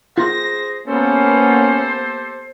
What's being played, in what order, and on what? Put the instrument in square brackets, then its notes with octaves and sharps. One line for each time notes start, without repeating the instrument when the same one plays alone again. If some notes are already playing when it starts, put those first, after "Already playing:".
[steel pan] F4 [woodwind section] G#4 C5 [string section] A#6
[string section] A#3 B3 [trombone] C#4 [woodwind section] G4 A4 C5